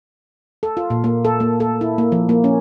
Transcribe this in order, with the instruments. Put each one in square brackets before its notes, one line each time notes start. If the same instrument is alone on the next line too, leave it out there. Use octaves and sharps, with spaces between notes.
[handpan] A4
F4
A#2
A#3
A4
A#3
A4
E4
A#3
F3
A#3
C#4